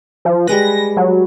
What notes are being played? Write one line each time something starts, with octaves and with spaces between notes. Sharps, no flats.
F3
G3 G#3 B4 A#6
F#3